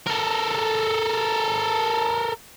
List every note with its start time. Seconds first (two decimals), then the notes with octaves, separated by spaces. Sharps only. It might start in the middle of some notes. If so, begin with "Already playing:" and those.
0.06 A4 A#4